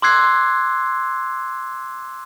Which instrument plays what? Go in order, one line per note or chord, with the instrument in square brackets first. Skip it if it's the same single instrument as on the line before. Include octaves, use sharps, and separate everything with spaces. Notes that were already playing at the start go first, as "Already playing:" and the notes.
[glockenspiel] C6 D6 E6 F#6 G#6 C7